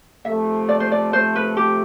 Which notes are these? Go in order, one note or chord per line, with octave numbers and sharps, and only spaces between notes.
C3 F3 A3 E5
D5
C5
D5
C5
B4
G4